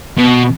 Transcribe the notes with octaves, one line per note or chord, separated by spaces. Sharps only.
B2